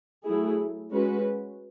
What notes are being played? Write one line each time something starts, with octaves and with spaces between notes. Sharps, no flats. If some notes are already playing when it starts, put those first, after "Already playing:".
F#3 A3 E4 G#4
G#3 C#4 F#4 B4